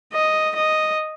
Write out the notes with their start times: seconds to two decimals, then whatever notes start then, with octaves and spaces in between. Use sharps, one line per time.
0.14 D#5
0.56 D#5